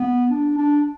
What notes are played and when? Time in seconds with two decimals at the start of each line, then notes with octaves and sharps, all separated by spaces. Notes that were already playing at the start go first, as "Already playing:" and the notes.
Already playing: B3
0.30 D4
0.57 D4